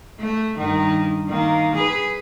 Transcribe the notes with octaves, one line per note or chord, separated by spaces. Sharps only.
A3
G2 D#3
D#3 A#3
G#4 B4